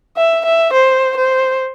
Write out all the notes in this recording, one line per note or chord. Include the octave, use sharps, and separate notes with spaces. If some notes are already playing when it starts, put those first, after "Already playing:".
E5
E5
C5
C5